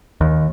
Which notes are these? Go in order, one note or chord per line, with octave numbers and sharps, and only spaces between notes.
D#2